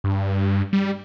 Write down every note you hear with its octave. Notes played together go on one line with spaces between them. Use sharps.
G2
G3